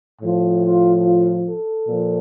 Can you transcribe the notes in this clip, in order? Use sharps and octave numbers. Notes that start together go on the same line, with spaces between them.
A2 F3
F4
F4
A4
A#2 F3